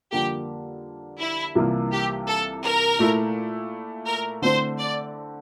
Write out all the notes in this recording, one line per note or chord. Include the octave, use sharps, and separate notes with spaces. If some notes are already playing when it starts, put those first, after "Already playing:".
F2 D3 G3 A#3 G4
E4
C2 C3 E3 A#3 F4
G4
A4
A#4
A#2 A3 E4
A#4
D3 A3 C4 E4 C5
D5